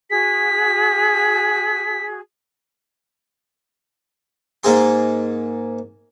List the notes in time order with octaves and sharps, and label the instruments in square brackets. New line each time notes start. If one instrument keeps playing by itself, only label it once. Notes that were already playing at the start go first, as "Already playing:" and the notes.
[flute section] F#4 G#4 [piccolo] B6
[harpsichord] G#2 A#3 G#4 C6